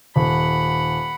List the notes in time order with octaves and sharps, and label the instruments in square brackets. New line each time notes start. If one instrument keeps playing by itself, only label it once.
[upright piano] D#1 [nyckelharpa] F#5 B5